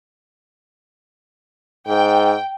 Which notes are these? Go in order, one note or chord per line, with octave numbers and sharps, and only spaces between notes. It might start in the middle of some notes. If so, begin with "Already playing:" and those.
G#2 G5